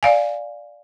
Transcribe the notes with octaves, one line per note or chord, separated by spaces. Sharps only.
D5 F5 G#5